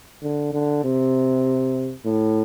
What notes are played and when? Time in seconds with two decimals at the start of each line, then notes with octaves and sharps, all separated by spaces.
0.22 D3
0.53 D3
0.84 C3
2.05 A2